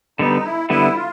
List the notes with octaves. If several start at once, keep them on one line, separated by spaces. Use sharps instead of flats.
D3 G3 B3 D#4
E4
D3 G3 B3 E4
F4